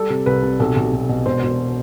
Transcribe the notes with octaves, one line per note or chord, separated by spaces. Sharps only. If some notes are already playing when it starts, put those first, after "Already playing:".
Already playing: G3 A4
C3
C2 B4
C3
B1 A4
B1
B1
B2
E1 C5
E1